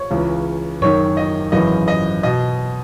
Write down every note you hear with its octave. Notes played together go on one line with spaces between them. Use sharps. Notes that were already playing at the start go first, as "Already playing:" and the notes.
Already playing: C#5
C#2 C#3 E3
F#1 F#2 D#3 C#5
D#5
G#1 F#2 C#3 E3 D#5
D#5
B2 D#5